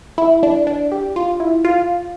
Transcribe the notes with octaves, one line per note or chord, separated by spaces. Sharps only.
E4
D4
D4
G4
F4
E4
F4